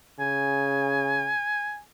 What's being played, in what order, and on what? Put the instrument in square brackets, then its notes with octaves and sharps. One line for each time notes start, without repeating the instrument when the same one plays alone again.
[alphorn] C#3 [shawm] G#5